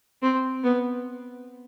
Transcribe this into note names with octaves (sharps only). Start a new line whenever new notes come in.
C4
B3